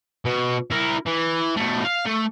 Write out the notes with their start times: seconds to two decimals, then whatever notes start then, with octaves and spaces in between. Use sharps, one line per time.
0.25 B2
0.71 E4 A#4
1.06 E3
1.57 B2 A3
1.85 F5
2.06 A3